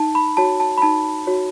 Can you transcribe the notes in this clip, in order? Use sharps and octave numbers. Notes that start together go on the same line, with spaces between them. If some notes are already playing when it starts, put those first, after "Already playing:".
Already playing: D#4 A5
B5
F#4 C#5 A5
A5
B5
D#4 A5
F#4 C#5